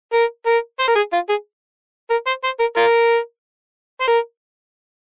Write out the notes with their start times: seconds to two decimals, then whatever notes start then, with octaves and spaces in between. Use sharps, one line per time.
0.13 A#4
0.47 A#4
0.79 C5
0.88 A#4
0.95 G#4
1.13 F4
1.29 G#4
2.10 A#4
2.26 C5
2.44 C5
2.60 A#4
2.77 F4 A#4
4.01 C5
4.08 A#4